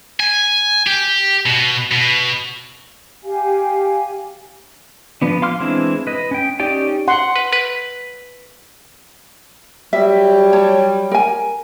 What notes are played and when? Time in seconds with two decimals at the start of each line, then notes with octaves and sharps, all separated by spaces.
0.20 G#5
0.87 G4
1.46 B2
1.91 B2
3.24 G4 F5 G#5
5.22 F3 B3 D4
5.42 F5 C6 D6 F6
5.60 E3 G#3 C4 D4 E4
6.07 B4 D#5
6.31 C#4 G5
6.60 C#4 D#4 G4 D5 G5
7.08 F#5 C6
7.36 B4
7.53 B4
9.93 F#3 G3 E5
10.53 C#5 A5
11.12 A#4 G#5